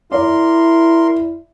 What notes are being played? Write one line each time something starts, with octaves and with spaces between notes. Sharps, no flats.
E4 A#4 D5 C6